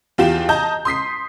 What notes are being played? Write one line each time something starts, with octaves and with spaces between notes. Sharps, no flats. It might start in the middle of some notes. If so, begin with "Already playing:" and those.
E2 F4 G4 E7
D#5 A5 A#5 G6
C6 D#6 B6 C7